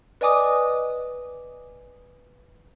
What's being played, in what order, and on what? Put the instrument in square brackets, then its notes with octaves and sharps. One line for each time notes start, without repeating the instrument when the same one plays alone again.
[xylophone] B4 D5 D#5 G#5 D6 D#6